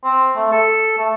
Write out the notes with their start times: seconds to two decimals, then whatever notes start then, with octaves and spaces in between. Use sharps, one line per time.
0.04 C4
0.37 A3
0.52 A4
0.98 A3